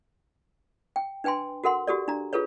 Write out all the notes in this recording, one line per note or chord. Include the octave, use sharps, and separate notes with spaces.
G5
D4 B4 G5 G#5 C6
F#4 A4 A#4 F#5 C6
F#4 G4 A4 D5
D4 A#5
F4 G#4 A4 B4 C#5